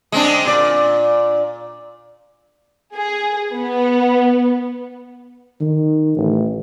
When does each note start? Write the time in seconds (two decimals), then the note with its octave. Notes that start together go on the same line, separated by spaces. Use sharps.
0.12 G#3 C4 D4
0.45 A#2 D5
2.95 G#4
3.53 B3
5.61 D#3
6.17 A1